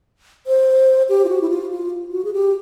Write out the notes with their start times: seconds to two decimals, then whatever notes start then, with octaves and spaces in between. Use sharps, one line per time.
0.47 C5
1.09 G4
1.25 F4
1.29 F#4
1.42 E4
1.50 F4
1.71 F4
2.12 F#4
2.25 G#4
2.33 G4